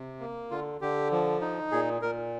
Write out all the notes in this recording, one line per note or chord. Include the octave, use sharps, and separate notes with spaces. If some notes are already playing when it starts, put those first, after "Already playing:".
Already playing: C3
A#3
D3 F4
D3 G4
F3
D#4
A#2 G#4
A#2 A#4